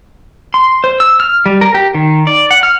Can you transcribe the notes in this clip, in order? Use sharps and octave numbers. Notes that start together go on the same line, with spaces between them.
C6
C5
E6
F6
G3
A#4
G4
D#3
D5
F#5
F6